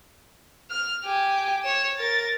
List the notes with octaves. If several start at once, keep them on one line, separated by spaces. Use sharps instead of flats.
F6
G4 G#5
C#5 E7
A#4 A6